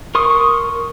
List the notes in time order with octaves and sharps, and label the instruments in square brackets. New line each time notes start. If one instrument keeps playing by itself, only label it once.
[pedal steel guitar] A#4 C6 C#6 D#6